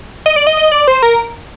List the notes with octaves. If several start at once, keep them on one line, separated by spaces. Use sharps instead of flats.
D#5
D5
D#5
D#5
D5
C5
A#4